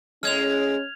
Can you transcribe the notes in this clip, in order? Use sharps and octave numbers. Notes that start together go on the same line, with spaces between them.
A2 G#3 C#4 F6 G#6 F7